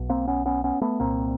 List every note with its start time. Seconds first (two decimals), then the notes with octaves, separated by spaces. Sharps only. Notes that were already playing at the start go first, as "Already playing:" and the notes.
Already playing: B1 B2
0.09 A#3 C4
0.27 B3 C#4
0.46 B3 C#4
0.64 B3 C#4
0.82 A3 B3
1.00 C2 A#2 A#3 C4